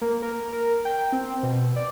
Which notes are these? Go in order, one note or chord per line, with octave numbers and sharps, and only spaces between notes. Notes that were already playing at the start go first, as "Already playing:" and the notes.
A#3
A#4
A#4
G5
C4
B2
D5